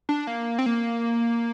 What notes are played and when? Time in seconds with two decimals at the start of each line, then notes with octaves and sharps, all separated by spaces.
0.09 D4
0.27 A#3
0.59 C4
0.66 A#3